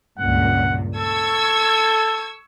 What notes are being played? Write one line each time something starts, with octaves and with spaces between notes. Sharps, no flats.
C#2 G2 A#2 F#5
A4 C#6 E6 G#6